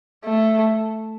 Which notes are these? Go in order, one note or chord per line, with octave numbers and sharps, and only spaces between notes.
A3